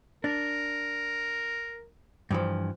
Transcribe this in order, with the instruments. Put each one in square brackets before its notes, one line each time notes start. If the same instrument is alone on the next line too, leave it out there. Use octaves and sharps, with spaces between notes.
[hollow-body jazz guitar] D4 [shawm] A#4
[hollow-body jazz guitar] G2 E3 F3